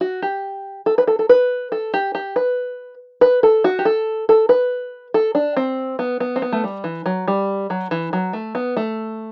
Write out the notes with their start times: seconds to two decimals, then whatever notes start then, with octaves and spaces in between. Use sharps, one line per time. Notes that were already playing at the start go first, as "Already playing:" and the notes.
0.01 F#4
0.22 G4
0.86 A4
0.98 B4
1.07 A4
1.19 A4
1.29 B4
1.72 A4
1.94 G4
2.15 G4
2.36 B4
3.21 B4
3.43 A4
3.64 F#4
3.79 G4
3.85 A4
4.29 A4
4.49 B4
5.14 A4
5.35 D4
5.57 C4
5.99 B3
6.20 B3
6.36 C4
6.42 B3
6.53 A3
6.64 G3
6.84 E3
7.06 F#3
7.28 G3
7.70 F#3
7.91 E3
8.13 F#3
8.33 A3
8.55 B3
8.77 A3